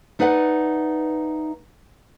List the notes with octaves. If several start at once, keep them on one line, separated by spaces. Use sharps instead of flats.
A3 D#4 B4 D5 F5 F#5